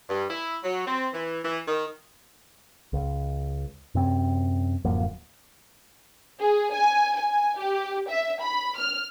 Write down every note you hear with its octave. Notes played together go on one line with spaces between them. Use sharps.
G2
E4
F#3
C4
E3
E3
D#3
C#2
F#2 C3 C4
D1 F#2 F3 A#3
G#4
G#5
G#5
G4
E5
B5
F6